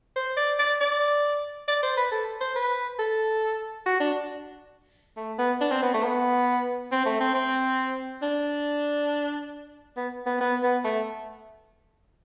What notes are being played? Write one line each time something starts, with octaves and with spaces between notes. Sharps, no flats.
C5
D5
D5
D5
D5
C5
B4
A4
C5
B4
A4
F#4
D4
A3
B3
D4
C4
B3
A3
B3
C4
A3
C4
C4
D4
B3
B3
B3
B3
A3